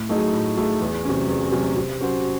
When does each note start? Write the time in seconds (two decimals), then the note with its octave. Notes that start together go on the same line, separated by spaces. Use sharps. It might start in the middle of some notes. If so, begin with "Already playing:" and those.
Already playing: A2
0.09 F#3 A3 D#4 G#4
0.33 A2
0.57 F#3 A3 D#4 G#4
0.81 E2
1.05 C3 F#3 C#4
1.28 E2
1.52 C3 F#3 C#4
1.77 C3
2.01 F#3 C#4 F#4 C5